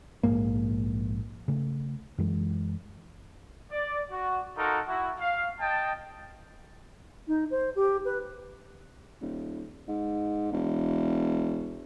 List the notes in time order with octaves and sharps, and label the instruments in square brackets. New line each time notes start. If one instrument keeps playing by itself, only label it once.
[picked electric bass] A#1 G#2 A#3
[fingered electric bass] C#3 A3
F#2 E3 G#3
[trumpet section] D5
F#4
D#4 F4 F#4 A4 A#4
E4 F#4
F5
D#5 G5 A5
[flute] D#4
C5
G4
B4
[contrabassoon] D#1
G#2
E1